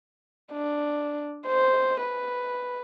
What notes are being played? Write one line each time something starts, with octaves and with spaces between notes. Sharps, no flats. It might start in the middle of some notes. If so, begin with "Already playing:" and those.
D4
C5
B4